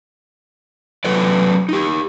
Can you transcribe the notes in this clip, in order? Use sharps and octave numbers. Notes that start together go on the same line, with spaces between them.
F#3 A4 B4 D5
D#4 G4